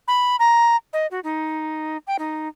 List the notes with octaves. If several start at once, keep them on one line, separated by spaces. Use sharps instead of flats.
B5
A#5
D#5
F#4
D#4
G5
D#4